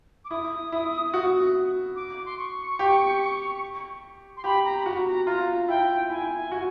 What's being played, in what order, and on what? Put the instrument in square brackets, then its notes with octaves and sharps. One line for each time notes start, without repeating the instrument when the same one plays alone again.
[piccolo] D6
[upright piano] E4 [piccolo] D#6
[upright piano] E4
F#4
[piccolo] D6
C6
C#6
[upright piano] G4
[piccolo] C6
[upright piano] G4 [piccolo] B5
[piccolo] A#5
B5
[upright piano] F#4 [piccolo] A#5
[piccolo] A#5
[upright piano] F4 [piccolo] A#5
[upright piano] E4 [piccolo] G5
[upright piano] E4 [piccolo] G#5
[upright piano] F#4